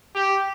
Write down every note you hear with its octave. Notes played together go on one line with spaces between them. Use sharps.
G4